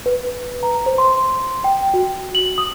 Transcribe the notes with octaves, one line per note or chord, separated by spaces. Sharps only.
B4
A#5
C5
C6
G5
F#4
F#7
D#6